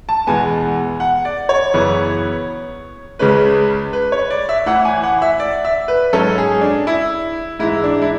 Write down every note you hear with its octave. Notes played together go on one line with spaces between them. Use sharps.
A5
E2 B2 G#3 B3 G#5
F#5
D5
C#5
F#2 C#3 E3 B3
C#2 C#3 G#3 C#4 B4
B4
C#5
D5
E5
A1 A2 E3 F#5
G#5
F#5
E5
D5
E5
B4
G#2 F#3 C#4 A4
G#4
D4
E4
G#2 E3 G#3 E4
D4
E4